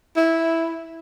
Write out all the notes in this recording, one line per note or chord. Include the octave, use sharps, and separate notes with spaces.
E4